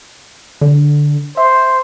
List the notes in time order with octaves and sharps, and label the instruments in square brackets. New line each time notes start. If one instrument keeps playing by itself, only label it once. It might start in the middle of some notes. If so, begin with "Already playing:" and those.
[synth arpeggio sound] D3
[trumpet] C5 [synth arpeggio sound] E5